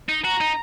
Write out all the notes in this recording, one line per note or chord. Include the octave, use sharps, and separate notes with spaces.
D#4
F#4 A#5
D#4